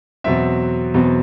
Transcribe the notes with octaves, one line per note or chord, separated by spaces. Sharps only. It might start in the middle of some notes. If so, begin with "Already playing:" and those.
E2 B2 F#3 C4 E5
E2 B2 F#3 C4